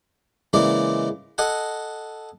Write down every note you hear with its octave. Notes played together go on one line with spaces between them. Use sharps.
C#3 E3 G#3 A#3 D5
A4 D#5 F#5 G#5